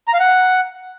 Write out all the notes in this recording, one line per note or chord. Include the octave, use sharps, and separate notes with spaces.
A#5
F5
F#5